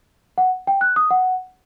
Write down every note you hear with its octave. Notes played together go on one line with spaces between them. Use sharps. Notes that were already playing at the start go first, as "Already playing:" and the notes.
F#5
G5
F#6
D#6
F#5